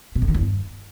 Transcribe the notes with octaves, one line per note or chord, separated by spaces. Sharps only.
B2
F2
D#3
E2
G2